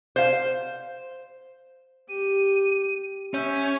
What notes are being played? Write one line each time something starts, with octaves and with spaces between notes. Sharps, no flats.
C5 F5
G4 D#7
C#4 E5 G6